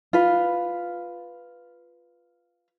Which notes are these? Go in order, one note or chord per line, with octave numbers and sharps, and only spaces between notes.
F4 B4